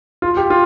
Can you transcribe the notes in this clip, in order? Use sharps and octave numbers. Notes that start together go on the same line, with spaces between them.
F4
G4
F4